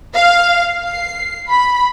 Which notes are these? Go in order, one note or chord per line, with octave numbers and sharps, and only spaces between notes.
F5
C7
B5